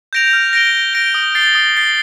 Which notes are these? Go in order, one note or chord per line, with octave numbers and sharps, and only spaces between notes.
G6 A#6 D7 F7
F6
A#6 D7 G7
F6
A#6 D7 G7
D#6
A6 C7 G7
D#6
A6 C7 G7